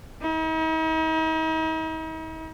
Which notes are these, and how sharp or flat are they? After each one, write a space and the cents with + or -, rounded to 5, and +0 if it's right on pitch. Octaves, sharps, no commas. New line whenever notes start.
D#4 +45